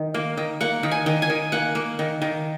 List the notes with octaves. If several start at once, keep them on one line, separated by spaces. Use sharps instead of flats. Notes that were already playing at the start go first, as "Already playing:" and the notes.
Already playing: D#3
A#3
D#3
A#3 F#5
D#3
G#5
D#3
G#5
D#3
A#3 F#5
A#3
D#3
D#3